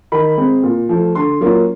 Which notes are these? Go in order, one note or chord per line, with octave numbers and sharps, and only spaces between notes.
D#3 B5
G#3 C4
A#2
F3 A3
D3 C6
F#3 A#3 C#4 F4